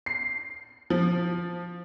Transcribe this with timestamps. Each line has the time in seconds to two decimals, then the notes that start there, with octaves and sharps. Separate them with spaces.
0.06 C7
0.90 F3